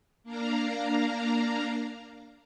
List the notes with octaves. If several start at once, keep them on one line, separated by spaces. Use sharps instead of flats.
A#3 D4 F5 A#5